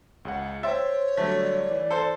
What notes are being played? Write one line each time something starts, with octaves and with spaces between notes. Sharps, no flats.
C#2 C#3 F#5
C5 C#5 E5 G5 C6 A6
D3 F#3 G3 A3
D5
E3
A4 C5